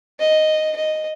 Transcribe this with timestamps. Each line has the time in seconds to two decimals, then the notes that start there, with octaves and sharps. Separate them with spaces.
0.19 D#5
0.76 D#5